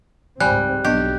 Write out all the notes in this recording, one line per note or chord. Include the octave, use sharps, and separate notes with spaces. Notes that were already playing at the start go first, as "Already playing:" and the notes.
C#2 G#2 G3 C4 G#5 B5 F#6
B1 B3 D4 G4 D#5